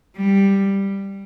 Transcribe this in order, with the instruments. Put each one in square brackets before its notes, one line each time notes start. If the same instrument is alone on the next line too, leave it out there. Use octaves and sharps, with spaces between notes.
[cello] G3